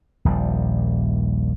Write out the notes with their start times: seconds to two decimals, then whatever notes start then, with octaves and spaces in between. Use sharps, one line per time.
0.25 D#1 A#1 G3